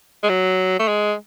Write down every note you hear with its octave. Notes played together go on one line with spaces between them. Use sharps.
G#3
F#3
A3
G#3